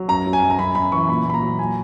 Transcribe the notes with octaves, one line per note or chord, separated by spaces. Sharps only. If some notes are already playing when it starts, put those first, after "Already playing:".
Already playing: F#3
F#2 A#5
F#3
G#5
F#2
A#5
F#2 B5
F#2 B5
E3 C#6
A#2 B5
A#2 B5
A#5
F#3
A#2 G#5